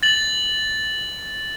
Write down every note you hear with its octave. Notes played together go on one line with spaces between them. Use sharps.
A6 F#7